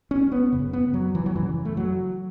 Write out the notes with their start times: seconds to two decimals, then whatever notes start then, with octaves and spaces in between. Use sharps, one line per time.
0.11 C#4
0.32 B3
0.52 F#2 C#3
0.73 B3
0.94 F#3
1.15 E3
1.26 F#3
1.35 F#2 C#3 E3
1.65 A3
1.77 F#3